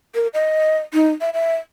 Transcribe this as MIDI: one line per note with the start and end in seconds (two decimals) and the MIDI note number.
0.15 0.27 70
0.34 0.78 75
0.94 1.10 63
1.21 1.30 76
1.34 1.56 76